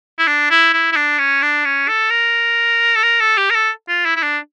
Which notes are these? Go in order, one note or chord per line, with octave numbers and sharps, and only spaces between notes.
E4
D4
E4
E4
E4
D4
C#4
D4
C#4
A4
A#4
A4
A#4
A4
G4
A#4
A4
F4
E4
E4
D4